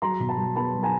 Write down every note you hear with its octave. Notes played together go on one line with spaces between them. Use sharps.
F#3 A#5 C6
B2
A5 B5
F#3
B3 A5 B5
F#3
G#5 A#5